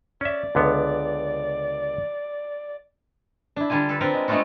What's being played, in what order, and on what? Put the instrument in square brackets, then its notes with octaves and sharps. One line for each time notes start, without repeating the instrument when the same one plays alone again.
[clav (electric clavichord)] C#4 E5 [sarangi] D5
[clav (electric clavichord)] C#2 D3 B3
[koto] D4 E4
D3 G3 F4 G#5
A4 B4
C4 D4 A#4 B4
G#3
G#3 A3 B3 D4 F4 F#4